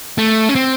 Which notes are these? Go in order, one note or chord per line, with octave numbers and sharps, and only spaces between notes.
A3
C#4
C4